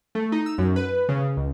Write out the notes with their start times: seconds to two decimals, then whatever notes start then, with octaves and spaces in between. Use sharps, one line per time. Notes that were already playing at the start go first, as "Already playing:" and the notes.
0.15 A3
0.32 D#4
0.46 E6
0.58 F#2
0.76 B4
1.09 C#3
1.37 C#2